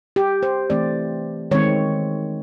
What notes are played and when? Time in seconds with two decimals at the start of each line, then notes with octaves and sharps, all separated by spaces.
0.16 G4
0.43 C5
0.70 E3 A3 C4 D5
1.51 D#3 G#3 C4 C#5